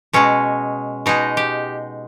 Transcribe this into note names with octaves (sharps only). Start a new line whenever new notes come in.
B2 G#3 C#4
B2 G#3 D#4
G4